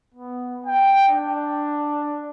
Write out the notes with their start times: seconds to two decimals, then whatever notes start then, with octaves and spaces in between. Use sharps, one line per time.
0.14 B3
0.66 G5
1.09 D4